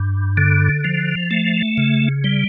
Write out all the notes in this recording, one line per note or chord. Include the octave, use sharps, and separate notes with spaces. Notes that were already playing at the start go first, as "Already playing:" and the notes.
Already playing: G2
D3
F3
A3
C#3
G3